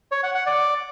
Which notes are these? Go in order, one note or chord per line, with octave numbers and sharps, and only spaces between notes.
C#5
F#5
F#5
D5